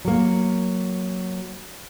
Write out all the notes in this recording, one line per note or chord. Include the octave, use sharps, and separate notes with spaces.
F#3 A#3